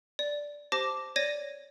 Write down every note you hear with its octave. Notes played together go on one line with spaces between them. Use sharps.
D5
G4 C5 A5 D6 A#6
C#5 D5 G#6 A#6 D#7